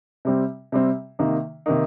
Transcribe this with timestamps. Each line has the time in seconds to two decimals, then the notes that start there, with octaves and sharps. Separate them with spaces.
0.25 C3 G3 C4
0.72 C3 G3 C4
1.19 C3 D#3 A#3 D#4
1.66 C3 D#3 A#3 D#4